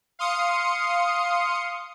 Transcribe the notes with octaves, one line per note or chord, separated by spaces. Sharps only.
F5 C6 D#6 C#7